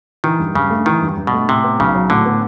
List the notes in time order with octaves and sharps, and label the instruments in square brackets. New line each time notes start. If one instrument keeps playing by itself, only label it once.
[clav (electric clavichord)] D#3 [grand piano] E3
[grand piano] G2
[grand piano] G2 [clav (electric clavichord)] C#3
[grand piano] A3
[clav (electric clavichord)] D#3 [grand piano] E3
[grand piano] G2
G2
[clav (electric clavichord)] B2
[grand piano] A3
[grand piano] A2 [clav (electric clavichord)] C3
[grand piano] B3
[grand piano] B1 [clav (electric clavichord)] C#3
[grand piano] F#3
[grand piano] A2 [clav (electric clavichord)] D3
[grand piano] B3